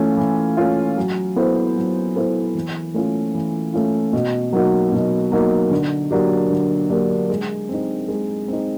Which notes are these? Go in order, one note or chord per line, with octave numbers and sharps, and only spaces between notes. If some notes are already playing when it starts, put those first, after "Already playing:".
Already playing: E3 A3 C#4 F4
E3
A3 C#4 F4
F#3
B3 E4 A4 C5
F#3
B3 E4 A4 C5
E3
A3 C#4 F4
E3
A3 C#4 F4
B2
F#3 A#3 D#4 F#4
B2
F#3 A#3 D#4 F#4
D3
F#3 A#3 D4 G4
D3
F#3 A#3 D4 G4
G#3
C4 D#4
G#3
C4 D#4